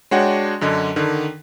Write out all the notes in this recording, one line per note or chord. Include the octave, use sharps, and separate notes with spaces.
G#3 D4 F#4 C#5 F#5 G5
F#2 D3 D#5
D3 D#3